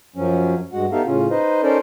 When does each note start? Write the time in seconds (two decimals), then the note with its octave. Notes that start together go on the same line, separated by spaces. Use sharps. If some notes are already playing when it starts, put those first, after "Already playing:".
0.16 F#2 F3 F#3 C#4
0.73 G2 G#3 F#4 F#5
0.92 B3 D#4 G4 A4 E5 F5
1.06 A2 C#3 C#4 F4
1.30 D#4 B4 C5 D#5
1.63 C#4 D#4 A4 A#4 C5 D5